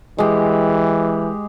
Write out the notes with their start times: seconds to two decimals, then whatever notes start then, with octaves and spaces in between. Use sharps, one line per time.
0.18 E3 G#3 G4